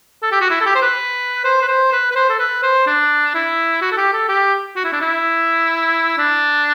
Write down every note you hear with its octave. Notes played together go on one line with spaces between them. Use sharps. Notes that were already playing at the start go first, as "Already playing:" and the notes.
A4
G4
F#4
E4
A4
G4
C5
B4
C5
B4
C5
B4
B4
C5
A4
B4
C5
D4
E4
F#4
A4
G4
A4
G4
F#4
E4
D4
E4
D4